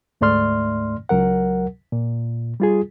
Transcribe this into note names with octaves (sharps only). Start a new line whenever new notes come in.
D2 G#2 A3 D5 C6 F6
C#2 F#3 A#4 F#5
A#2
G3 F4 G#4